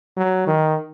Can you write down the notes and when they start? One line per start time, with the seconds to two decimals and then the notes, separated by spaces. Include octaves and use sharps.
0.17 F#3
0.47 D#3